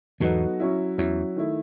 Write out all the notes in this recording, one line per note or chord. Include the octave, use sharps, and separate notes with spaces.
E2 G#2 F#3 B3 D#4 F#4 A4
F#3 C#4 E4
E2 F#3 C#4 E4
D#3 A3 E4